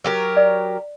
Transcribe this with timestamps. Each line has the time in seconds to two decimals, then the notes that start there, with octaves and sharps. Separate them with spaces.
0.04 F#3 G4 A#4
0.37 D5